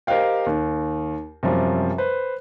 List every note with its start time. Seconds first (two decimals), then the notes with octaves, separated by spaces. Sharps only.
0.07 G4 A#4 C5 D#5 F5 G5
0.46 D#2
1.43 F#2 C3 F3 G3
1.98 B4 C5